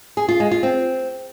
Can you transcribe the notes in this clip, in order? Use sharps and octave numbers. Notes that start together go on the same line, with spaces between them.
G#4
F4
G#3
F4
C4